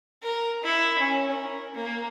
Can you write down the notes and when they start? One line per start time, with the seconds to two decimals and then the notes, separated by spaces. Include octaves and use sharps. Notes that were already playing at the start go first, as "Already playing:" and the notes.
0.23 A#4
0.64 E4
0.99 C#4
1.32 A#4
1.74 A#3